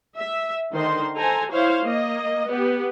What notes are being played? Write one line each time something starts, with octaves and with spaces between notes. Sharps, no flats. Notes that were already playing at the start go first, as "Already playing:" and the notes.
E5
D3 D#3 D#4 C5 C6
A4 C5 G#5 A#5
E4 C5 C#5 F5
A#3 D#5
B3 G4